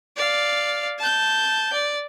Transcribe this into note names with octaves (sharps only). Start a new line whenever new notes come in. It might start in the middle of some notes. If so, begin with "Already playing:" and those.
D5 F5
A5 G6
D5